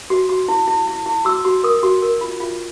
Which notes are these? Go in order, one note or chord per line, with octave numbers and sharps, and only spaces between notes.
F#4
F#4
E4
E4
E4
E4
F#4 E6
F#4
A#4 D#6
F#4
A#4
F4
F4